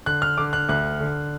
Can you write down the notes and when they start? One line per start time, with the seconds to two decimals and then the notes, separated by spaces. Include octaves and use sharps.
0.06 D3 F#6
0.22 F6
0.38 D3 D6
0.53 F#6
0.69 D2 F#6
1.01 D3